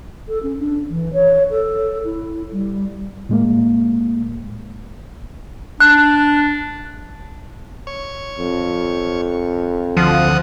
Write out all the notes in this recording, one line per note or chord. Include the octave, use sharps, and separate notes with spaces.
A4
C#4
D4
E3
C#5
A4
E4
G3
A2 G#3 A#3
D4 F#6
C#5
F2
D2 F3 F#5 D#6